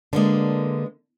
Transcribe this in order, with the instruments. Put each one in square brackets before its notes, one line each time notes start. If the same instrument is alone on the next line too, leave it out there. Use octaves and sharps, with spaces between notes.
[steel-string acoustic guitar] D3 A#3 [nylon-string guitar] G#3 B3 D4